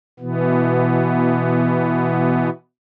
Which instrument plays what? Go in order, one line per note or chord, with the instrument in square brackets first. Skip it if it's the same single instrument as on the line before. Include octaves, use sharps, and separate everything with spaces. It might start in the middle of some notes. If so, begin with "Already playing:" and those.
[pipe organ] B2 E3 B3